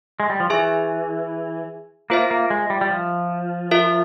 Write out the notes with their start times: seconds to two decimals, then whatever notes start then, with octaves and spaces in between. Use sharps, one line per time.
0.20 G#3
0.30 G3
0.40 F3
0.50 E3 G#4 E5 G#5
2.10 A#3 F4 C5 E5
2.31 A#3
2.50 G#3
2.70 G3
2.81 G3
2.91 F3
3.71 F4 A#4 E5